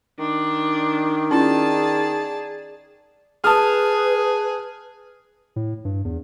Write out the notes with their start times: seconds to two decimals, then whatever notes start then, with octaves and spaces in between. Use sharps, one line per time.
0.19 D#3 D4
1.31 C#4 E4 F4 G#4 D5 A5
3.44 G#4 B4 A5 D#6 F6
5.56 A2
5.85 G2
6.05 E2